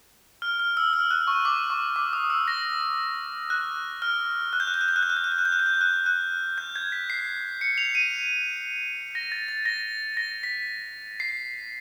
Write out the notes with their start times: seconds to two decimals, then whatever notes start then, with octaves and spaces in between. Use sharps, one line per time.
0.42 F6
0.60 F6
0.77 E6
0.93 F6
1.11 F#6
1.27 C#6
1.45 D6
1.70 C#6
1.96 D6
2.13 D#6
2.30 E6
2.48 A#6
3.50 F#6
4.02 F6
4.53 F#6
4.60 G6
4.67 F#6
4.74 G6
4.81 F#6
4.89 G6
4.96 F#6
5.03 G6
5.10 F#6
5.17 G6
5.24 F#6
5.32 G6
5.38 F#6
5.45 G6
5.52 F#6
5.60 G6
5.66 F#6
5.74 G6
5.81 F#6
6.06 F#6
6.58 G6
6.76 G#6
6.92 B6
7.10 C7
7.61 C#7
7.78 F7
7.95 D#7
9.15 A#6
9.32 A6
9.48 A6
9.66 A#6
10.17 A#6
10.43 B6
11.20 C7